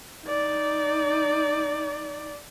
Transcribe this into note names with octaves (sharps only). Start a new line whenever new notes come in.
D#4 D5